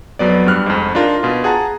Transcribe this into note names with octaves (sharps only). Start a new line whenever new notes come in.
F2 F#3 B3 D5
G2 G3 F6 F#6
F2 G#2
D4 D#4 F4 A#4
B2 F4
G#4 F#5 A5 A#5